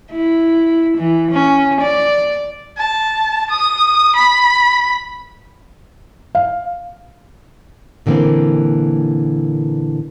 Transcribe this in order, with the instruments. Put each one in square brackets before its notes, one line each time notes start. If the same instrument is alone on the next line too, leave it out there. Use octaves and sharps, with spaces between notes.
[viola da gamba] E4
E3
C#4
D5
[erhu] A5
D#6
B5
[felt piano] F5
[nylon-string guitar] A#2 D3 E3 A3 A#3 C4